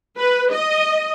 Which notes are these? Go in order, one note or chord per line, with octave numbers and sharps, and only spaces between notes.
B4
D#5